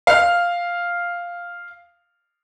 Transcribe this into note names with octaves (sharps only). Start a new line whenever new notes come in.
F5 F6